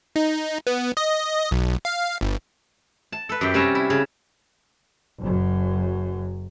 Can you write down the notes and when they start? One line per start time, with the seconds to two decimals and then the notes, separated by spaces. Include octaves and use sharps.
0.16 D#4
0.67 B3
0.97 D#5
1.51 B1
1.85 F5
2.21 G1
3.12 A5
3.29 A4 B4
3.41 F#2 G4
3.54 C3 G3 C#4 F#4 A5 A#5
3.75 E4
3.90 C#3
5.20 F#1 F#2